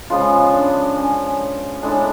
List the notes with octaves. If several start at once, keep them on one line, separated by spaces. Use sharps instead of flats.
C#3 F3 G#3 B3 F4
D4
C#4
A2 G#3 B3 D4